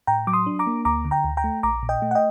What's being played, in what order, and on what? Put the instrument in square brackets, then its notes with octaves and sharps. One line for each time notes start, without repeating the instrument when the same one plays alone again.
[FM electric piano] A2 G5 A#5
F#3 D6
C6 D#6
D4
A#5 D6
A#3
D2 A#5 D6
D3
G5 A#5
D2
G5 A#5
A3
A#1 A#5 D6
A#2
D#5 G5
A3
F#5
D#5 G5